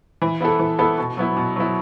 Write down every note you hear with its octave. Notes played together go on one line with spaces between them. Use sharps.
E3
B3 E4 A4
E3
B3 E4 A4
B2
F#3 B3 E4
B2
F#3 B3 E4